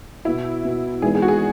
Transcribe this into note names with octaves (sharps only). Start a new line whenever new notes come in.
B2 B3 E4 F#4
B2 B3 F#4
G#1 G#2 E3 G#3 B3 G#4
G#4
F#4
G#4